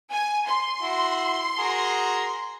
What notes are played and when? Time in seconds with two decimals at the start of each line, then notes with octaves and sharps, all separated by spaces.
0.11 G#5
0.46 C6
0.81 E4 F#4
1.58 F#4 G#4 A#4